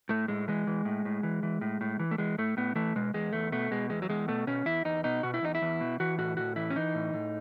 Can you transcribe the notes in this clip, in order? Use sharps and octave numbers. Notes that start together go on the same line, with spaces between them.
A2 A3
A2 G#3
E3 G#3
E3
A2
A2
E3
E3
A2
A2
E3
A3
E3 G#3
A2 A3
A2 B3
E3 A3
B2 G#3
E2 G#3
E2 A3
B2 A3
B2 G#3
E2 G#3
F#3
E2 G#3
B2 A3
B2 C#4
E2 E4
E2 D#4
B2 D#4
B2 F#4
E4
E2 D#4
E4
E2
B2
E3 F#4
A2 F#4
A2 F#4
E3 E4
C#4
E3 D#4
A2
A2